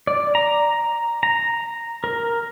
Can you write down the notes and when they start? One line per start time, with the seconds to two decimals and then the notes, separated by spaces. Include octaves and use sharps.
0.07 D5
0.35 A#5
1.23 A#5
2.04 A#4